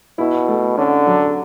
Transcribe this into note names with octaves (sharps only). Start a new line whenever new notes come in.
B2 E4
A3
D3 C#4
F#3